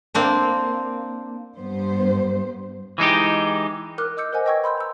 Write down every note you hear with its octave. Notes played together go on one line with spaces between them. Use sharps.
A#3 C4 D4
G2 B3 C5
E3 G#3 D#4 G4
A#4 D6 F6 F#6
D#5 D6 E6 G6 C#7
A#4 C5 D#5 F#5 G#5
B4 D#5 G5 C#6 E6 G#6
B5 C6 E6 G6
A#5 E6